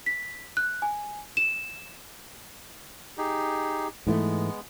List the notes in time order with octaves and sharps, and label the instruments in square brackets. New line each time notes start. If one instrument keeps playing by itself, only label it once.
[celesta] B6
F#6
G#5
E7
[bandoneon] D#4 G4 G#4
[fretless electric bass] G#2 E3 A3 [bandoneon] G#3 B3